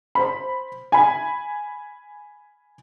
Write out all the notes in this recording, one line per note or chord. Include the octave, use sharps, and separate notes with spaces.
C5 B5
G#5 B5